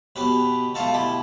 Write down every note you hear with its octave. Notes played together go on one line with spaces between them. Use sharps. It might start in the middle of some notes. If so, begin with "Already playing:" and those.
B2 B3 G4 B4
B2 A3 F4 A4
E4 G4